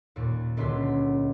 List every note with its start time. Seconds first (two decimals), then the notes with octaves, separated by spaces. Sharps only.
0.16 D#2 A#2
0.57 D#1 C#2 D3 F#3 C6 B6